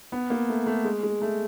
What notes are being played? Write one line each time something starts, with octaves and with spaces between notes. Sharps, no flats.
B3
A#3
A3
A3
G#3
G#3
A3